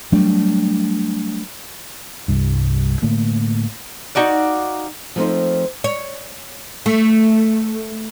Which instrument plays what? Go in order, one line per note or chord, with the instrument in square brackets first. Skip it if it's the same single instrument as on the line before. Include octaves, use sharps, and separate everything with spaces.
[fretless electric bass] F#3 G3 A3 D4
[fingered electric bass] C2 G2
A2 D3 A3 A#3
[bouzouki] D#4 F#4 D5 F5
[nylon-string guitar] F3 A3 A#3 C4 D#4 C5
[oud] C#5
A3